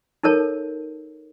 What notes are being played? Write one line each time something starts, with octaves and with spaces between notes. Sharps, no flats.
D#4 A4 A#4 C#5 A5